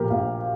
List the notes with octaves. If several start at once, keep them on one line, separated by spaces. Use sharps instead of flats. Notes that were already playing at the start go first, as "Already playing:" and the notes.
Already playing: A#2 F3 G4 A#4
A#1 F5